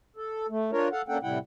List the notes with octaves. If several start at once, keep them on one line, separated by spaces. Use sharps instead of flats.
A4
A3
D4 F4 A#4 C#5
A4 F5 F#5
A#3 C#4 D4 A4 F#5 G5
A2 C3 G3 E4 F#5 G5